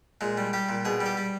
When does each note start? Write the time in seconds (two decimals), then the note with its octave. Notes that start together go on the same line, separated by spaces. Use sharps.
0.21 A#2 G#3
0.38 G3
0.53 G3 G4
0.69 A#2
0.85 B2 G#4
1.01 G3
1.06 G4
1.17 G3